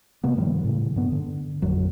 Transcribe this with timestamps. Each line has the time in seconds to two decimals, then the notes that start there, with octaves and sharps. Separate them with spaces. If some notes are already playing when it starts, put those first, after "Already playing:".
0.24 C3 A#3 B3
0.37 G2 D#3 F3 G3
0.64 A2 C#3
0.96 G2 B3
1.12 D3
1.62 A1 F2 F#3